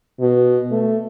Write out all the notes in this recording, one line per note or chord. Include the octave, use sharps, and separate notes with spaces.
B2
A3